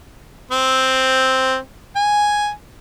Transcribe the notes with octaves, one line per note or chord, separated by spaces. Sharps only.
C4
G#5